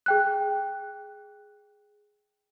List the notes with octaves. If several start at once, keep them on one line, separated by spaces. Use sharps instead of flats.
G#4 G5 F#6